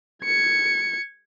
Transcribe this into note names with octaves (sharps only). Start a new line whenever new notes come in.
G#6 C#7